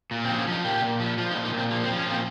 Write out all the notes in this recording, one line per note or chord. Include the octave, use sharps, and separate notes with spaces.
A#2
C4
F3
C#4
F3 D#4
A#2 G4
A#2
F3
F3 F4
D#4
A#2
D#4
A#2 C4
F3 A#3
C4
F3
C#4
A#2 C4